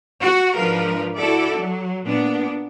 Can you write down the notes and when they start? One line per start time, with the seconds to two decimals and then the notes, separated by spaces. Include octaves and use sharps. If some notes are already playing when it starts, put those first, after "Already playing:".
0.21 F#4
0.57 G#2 F3 D4 A#4 B4
1.16 E4 F#4 A4 D5 E5
1.57 F#3
2.06 A#2 B3 D4